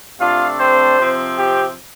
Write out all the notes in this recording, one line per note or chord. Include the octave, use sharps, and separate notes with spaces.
C3 A3 D4 F4 F5
C4 C5
C3 F3 C4
G4